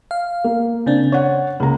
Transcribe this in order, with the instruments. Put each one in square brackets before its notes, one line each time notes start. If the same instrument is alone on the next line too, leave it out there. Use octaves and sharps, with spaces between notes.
[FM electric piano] F5
[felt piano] A#3
[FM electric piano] C#3 C4 D4
[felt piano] C#5 F#5
[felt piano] C#2 A#5 [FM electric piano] A#3